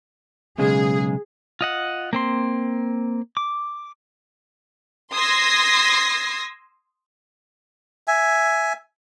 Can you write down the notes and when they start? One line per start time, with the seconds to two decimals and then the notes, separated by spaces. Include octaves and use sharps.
0.58 B1 C#3 G#3 G#4
1.61 F4 D#5 F#5
2.13 A#3 C4 C6
3.37 D6
5.13 C6 D#6 E6 G#6 A#6 C7
8.08 E5 G#5